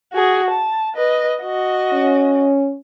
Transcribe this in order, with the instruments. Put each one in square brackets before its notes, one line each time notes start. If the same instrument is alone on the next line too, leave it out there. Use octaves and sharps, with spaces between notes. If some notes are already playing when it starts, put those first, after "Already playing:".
[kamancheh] F#4 G#4
A5
B4 D#5
F#4 D#5
[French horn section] C#4